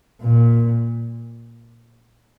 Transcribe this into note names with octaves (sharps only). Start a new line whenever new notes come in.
A#2